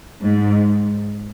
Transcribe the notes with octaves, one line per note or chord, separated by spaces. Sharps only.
G#2